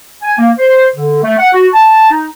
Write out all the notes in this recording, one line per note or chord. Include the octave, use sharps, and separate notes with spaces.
G#5
A#3
C5
D3
A3
F#5
F#4
A5
D#4